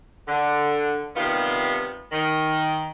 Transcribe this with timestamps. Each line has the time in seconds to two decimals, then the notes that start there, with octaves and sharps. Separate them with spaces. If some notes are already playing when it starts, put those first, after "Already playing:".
0.28 D3
1.16 C3 D#3 G3 B3 F4
2.12 D#3